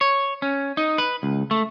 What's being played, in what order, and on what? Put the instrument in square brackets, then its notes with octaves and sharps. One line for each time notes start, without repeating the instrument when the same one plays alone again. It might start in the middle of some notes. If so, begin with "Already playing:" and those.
[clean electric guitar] C#5
C#4
D#4
B4
C#2
A3